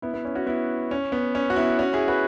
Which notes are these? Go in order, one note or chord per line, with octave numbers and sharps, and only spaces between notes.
B3 E4
B3
C#4
C#4 F#4
B3 E4
C#4
B3
C#4
F#4
B3 E4
C#4 F#4
E4 G#4
F#4 B4